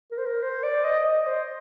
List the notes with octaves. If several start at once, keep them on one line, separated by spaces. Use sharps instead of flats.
A#4
C5
A#4
C5
D5
D#5
D#5
C5